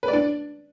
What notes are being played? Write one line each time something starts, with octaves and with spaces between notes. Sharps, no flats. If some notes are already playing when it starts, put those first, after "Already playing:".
B4
D5
D4